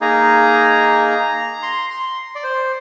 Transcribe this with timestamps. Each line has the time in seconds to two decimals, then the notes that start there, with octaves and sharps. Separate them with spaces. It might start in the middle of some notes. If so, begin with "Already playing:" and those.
0.01 A#3 D#4 G#4 A#5
1.63 C6
1.90 C6
2.35 D5
2.43 C5